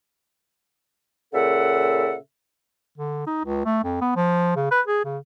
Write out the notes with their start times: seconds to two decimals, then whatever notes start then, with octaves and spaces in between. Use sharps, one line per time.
1.33 A#2 C#3 A4 E5 F#5
2.98 D3
3.27 D#4
3.45 C#2
3.66 A3
3.84 F2
4.01 B3
4.16 F3
4.56 C#3
4.71 B4
4.87 G#4
5.05 C#3